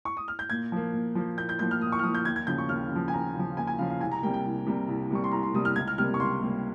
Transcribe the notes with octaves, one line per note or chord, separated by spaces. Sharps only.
C#6
D#6
F6
G6
A#2 G#6
F3 A#3
A#2
F3 A#3
A#2 G6
G6
F3 A#3 G6
F6
A#2 D#6
C#6
F6
F3 A#3 D#6
G6
D#2 G#6
G#6
C#3 F3 G6
C#6
D#2 F6
C#3 F3
G#5
D#2 A#5
C#3 F3
D#2 G#5
G#5
C#3 F3 F5
F5
C2 G#5
A#5
C3 G3 A#3 G5
G5
C2
C3 G3 A#3
C2
C3 G3 A#3 C#6
C6
C2 A#5
C6
C3 G3 A#3 D#6
F6
C#2 G#6
F6
C3 G3 A#3 F6
C#6
C#2 C6
C3 G3 A#3